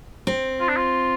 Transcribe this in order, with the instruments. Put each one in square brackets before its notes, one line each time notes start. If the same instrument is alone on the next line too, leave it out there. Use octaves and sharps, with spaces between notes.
[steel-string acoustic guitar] C4
[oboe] F4
D4
F4